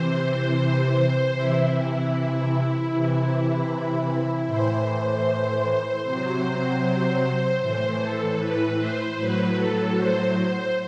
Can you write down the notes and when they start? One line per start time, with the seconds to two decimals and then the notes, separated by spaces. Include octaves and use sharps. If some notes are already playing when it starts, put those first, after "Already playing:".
Already playing: C3 E3 C5
1.34 C3 E3 E4
2.91 C3 E3
4.47 A2 E3 C5
6.03 C3 F#3 C5
7.60 A2 E3 C5
7.99 A4
8.38 B4
8.77 C5
9.16 A2 F#3 B4
9.55 A4
9.95 C5
10.32 C5